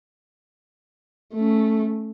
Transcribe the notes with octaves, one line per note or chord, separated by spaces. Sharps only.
A3 C#4